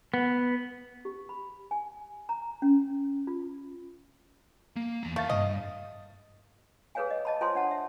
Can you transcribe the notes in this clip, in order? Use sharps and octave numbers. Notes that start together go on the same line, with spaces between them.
B3
G4
B5
G#5
A#5
C#4
F4
A#3
E2 A#5
A3 A#4 E5 F5 A6
C2 G2 D#5
G#4 A4 B4 C#5 F5 G#5
D#5
D#5 A5 B5
F4 A4 C5 C#5 G#5 C6
D4 F#5 A5
E5